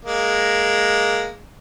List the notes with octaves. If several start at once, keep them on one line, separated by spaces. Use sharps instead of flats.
G#3 A#3